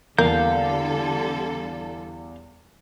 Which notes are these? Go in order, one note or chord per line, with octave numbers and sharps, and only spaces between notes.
E2 D3 G3 A#3 A4 F5 G6